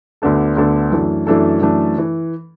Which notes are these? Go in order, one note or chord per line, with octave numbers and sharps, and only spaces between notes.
D2 D3 B3 D4 A4
D2 D3 B3 D4 A4
F#2 E3 A3 D4 A4
F#2 E3 A3 D4 A4
F#2 E3 A3 D4 A4
E3